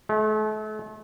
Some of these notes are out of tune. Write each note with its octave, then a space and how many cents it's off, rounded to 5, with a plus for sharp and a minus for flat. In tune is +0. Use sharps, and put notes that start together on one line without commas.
A3 -40